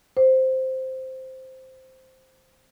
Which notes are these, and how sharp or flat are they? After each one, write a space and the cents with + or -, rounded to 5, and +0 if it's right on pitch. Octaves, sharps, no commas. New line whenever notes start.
C5 -5